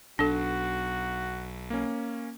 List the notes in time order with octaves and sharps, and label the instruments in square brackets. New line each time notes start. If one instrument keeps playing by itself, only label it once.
[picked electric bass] B1 [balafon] D4 A4 [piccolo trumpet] F#4
[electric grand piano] A#3 C#4